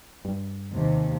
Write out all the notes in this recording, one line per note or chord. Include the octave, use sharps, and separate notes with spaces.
G2
D#2 C3